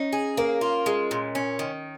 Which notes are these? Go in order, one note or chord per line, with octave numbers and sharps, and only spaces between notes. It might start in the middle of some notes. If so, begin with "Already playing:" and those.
Already playing: C#4 D#4
G#4
A#3 A#4
F4
G#3
A#2
C#4
D#3